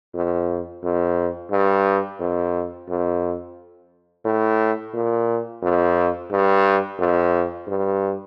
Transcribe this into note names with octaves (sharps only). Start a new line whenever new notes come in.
F2
F2
G2
F2
F2
A2
A#2
F2
G2
F2
G2